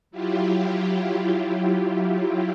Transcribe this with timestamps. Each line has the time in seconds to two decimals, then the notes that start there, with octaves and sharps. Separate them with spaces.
0.11 F#3 E4 F4 G4